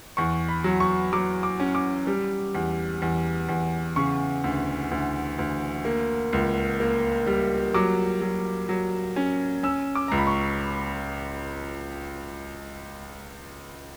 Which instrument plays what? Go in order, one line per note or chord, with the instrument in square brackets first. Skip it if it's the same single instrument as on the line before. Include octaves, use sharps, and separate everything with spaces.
[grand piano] E2 C#6
B5
F#3
C#6
F#3 D6
D6
C#4
D6
G3
E2
E2
E2
C#3 C#6
D2
D2
D2
A#3
C#2
A#3
G3
F#3 D6
F#3
F#3
C#4
C#4 E6
D6
C#2 A#5
B5
C#6